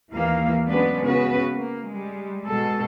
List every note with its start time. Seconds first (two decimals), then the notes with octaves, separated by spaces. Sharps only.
0.12 D#2 E3 A#3 F5
0.68 F#3 G#3 B3 C#4 D4 B4
1.04 C#3 B3 F#4 B4
1.55 A#3
1.92 G3 G#3
2.46 B2 G#3 A4